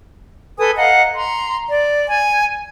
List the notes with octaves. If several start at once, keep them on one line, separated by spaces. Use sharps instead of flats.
A4 B4 G#5 D#6
D#5 F5 F#5 A#5
A#5 C6
D5
G#5